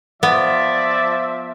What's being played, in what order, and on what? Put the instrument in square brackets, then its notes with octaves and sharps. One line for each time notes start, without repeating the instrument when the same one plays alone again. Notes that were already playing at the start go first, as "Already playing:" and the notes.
[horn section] F3 E5 [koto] B3 [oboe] D5